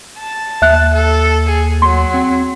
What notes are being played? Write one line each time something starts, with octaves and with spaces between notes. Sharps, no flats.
A5
D#2 E5 F#6
A4
G#4
F#3 C6
C4